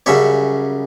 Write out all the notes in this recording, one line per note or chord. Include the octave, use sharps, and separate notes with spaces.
F#2 C#3 G3 C#5 E5